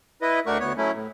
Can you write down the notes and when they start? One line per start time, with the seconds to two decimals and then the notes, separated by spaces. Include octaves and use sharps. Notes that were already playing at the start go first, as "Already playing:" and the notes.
0.22 E4 B4 D#5
0.46 D2 A3 D4 F#4 A#4 C#6
0.60 D2 B3 C#5
0.77 F#3 A3 C#4 E4
0.93 A2